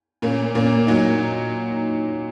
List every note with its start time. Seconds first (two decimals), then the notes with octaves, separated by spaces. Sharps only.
0.22 A#2 A#3 C#4
0.55 A#2 A#3 C#4
0.87 A#2 F#3 D#4